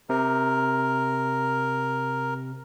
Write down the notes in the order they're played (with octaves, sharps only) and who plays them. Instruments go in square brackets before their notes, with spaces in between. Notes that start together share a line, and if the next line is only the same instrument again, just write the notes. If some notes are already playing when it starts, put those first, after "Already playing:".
[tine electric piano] C3 [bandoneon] A#4